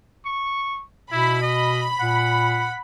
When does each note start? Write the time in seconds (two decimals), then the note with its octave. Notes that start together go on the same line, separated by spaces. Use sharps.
0.25 C#6
1.12 B2 E4 B5
1.42 D#5
2.01 A#2 F#5